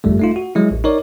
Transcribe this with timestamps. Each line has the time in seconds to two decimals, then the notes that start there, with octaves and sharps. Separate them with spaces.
0.04 G1 F#2 G3 A3
0.20 A3 D#4 F4
0.36 F#4
0.55 F#3 G#3 E4
0.71 A1
0.84 D#4 A#4 C#5 D5